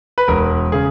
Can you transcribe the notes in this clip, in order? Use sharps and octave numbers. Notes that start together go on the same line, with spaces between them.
B4
E1 A#4
C#3 G#4